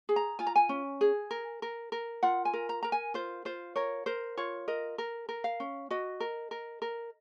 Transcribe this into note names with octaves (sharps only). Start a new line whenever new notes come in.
G#4
A#5
F4 G#5
A#5
G#5
C#4
G#4
A#4
A#4
A#4
F4 F#5
G#5
A#4
A#5
A#4 A#5
G#5
F4 C5
F4 C5
A#4 C#5
A#4 C5
F4 C#5
A#4 D#5
A#4
A#4
F5
C#4
F#4 D#5
A#4
A#4
A#4